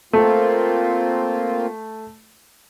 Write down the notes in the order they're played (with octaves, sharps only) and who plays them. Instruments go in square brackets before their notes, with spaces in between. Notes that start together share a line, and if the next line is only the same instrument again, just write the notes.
[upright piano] A3 [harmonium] A#3 C4 F4